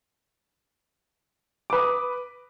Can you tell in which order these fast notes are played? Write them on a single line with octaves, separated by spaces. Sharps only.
D6 B4 D#6